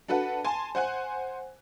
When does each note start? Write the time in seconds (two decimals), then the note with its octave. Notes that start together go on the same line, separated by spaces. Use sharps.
0.08 D4 F#4 A4 B4 F#5
0.44 G#5 A5 C6
0.75 C5 F#5 G#5 F#6